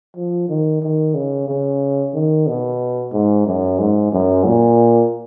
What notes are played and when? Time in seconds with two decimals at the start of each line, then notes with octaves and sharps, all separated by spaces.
0.16 F3
0.49 D#3
0.82 D#3
1.15 C#3
1.48 C#3
2.14 D#3
2.47 B2
3.13 G#2
3.46 F#2
3.79 G#2
4.12 F#2
4.44 A#2